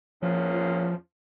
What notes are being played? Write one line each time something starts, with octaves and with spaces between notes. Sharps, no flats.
E2 A#2 F3 C#4